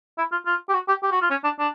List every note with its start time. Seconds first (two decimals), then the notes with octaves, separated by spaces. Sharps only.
0.18 E4
0.32 F4
0.46 F4
0.69 G4
0.74 F#4
0.88 G4
1.03 G4
1.12 F#4
1.22 F4
1.30 C#4
1.44 D4
1.59 D4